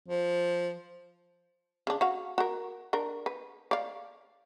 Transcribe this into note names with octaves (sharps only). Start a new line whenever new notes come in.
F3
C#3 D4
F#4 F5
F#4 A#4
D4 A#4
B4
D5 F5